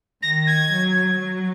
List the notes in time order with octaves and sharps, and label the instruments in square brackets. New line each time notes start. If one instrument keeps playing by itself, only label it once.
[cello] D#3 [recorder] A#6
[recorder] G#6
[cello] F#3
F#3